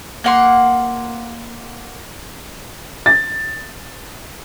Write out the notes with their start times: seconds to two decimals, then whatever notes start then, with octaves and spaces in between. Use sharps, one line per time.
0.24 A#3 F#5 C6
3.06 A6